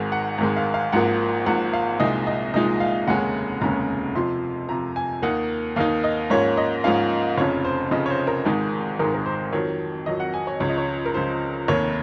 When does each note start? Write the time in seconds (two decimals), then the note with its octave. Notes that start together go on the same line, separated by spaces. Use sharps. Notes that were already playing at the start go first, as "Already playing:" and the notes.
Already playing: G#1 G#2 D#3 G#3
0.12 F#5
0.38 G#1 G#2 D#3 G#3
0.57 F5
0.74 F5
0.92 G#1 G#2 F3 A#3 F#5
1.46 G#1 G#2 F3 A#3 F#5
1.73 F5
2.00 C2 A#2 F3 G#3 D#4 D#5
2.27 D#5
2.54 C2 A#2 F3 G#3 D#4 D#5
2.80 F5
3.08 F1 D#2 C#3 G#3 C#4 F#5
3.61 F1 D#2 C#3 G#3 C#4 A#5
4.15 F2 C3 F3 C6
4.69 F2 C3 F3 A#5
4.96 G#5
5.22 D#2 D#3 A#3 D#4 F#5
5.76 D#2 D#3 A#3 D#4 F5
6.04 D#5
6.30 G#2 F3 A#3 C#4 C#5
6.57 D#5
6.84 G#2 F3 A#3 C#4 F5
7.38 F1 F2 C#3 C#5
7.65 C5
7.91 F1 F2 C#3 D#5
8.06 C#5
8.10 C5
8.27 A#4
8.45 G#1 G#2 D#3 G#3 D#4
8.99 G#1 G#2 D#3 G#3 D#4 A#4
9.14 A#4
9.26 C5
9.52 F2 D#3 F#3 C#5
10.06 F2 D#3 F#3 D#5
10.20 F#5
10.34 G#5
10.47 C#5
10.60 C#2 C#3 F3 C#5
10.69 D#5
10.78 C#5
11.06 A#4
11.14 C#2 C#3 F3 C5
11.68 F1 D#2 D#3 C#5